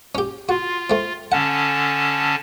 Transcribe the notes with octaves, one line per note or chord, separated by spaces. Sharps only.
C#4 G4
F4 F#4
A3 C4
D3 C#4 F#5 A5